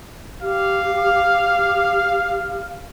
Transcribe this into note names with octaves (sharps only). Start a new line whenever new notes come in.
G4 F5